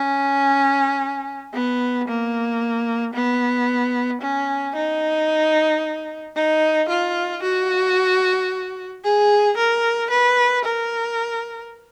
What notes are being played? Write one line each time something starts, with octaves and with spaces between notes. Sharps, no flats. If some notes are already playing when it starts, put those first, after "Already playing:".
Already playing: C#4
B3
A#3
B3
C#4
D#4
D#4
F4
F#4
G#4
A#4
B4
A#4